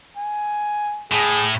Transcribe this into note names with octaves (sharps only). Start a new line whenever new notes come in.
G#5
A2 G#4